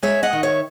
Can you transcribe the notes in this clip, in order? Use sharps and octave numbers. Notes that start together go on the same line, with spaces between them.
G#3 C#5 E5
D#5 F#5
D#3
C#5 E5